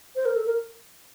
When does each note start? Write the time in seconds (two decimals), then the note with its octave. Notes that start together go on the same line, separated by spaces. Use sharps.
0.16 C5
0.25 A#4
0.36 A4
0.46 A#4